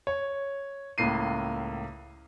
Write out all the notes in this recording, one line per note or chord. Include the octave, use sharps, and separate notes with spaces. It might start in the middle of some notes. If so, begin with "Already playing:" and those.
C#5
C#2 A2 A#3 C7 D#7